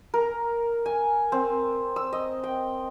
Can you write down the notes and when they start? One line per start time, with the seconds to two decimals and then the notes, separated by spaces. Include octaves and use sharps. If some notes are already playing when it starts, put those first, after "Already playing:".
0.14 A#4
0.86 G#5
1.32 C4
1.96 E6
2.13 D#5
2.44 G5